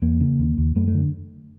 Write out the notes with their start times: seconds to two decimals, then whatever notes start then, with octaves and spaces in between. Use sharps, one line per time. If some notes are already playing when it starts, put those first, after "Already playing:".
0.02 E2 A#3
0.20 C#3
0.39 D#2
0.58 D#2
0.76 F#2 A3
0.88 A3
0.94 D3